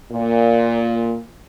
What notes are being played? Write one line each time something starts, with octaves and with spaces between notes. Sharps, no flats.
A#2